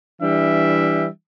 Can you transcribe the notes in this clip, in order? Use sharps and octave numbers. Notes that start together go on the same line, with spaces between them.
E3 G3 D4 E5